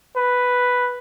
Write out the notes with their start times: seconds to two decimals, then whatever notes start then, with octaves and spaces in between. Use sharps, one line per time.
0.16 B4